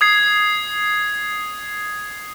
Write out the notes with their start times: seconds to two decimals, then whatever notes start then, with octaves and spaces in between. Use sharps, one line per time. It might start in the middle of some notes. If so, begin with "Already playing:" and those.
0.01 D#6 G#6 C7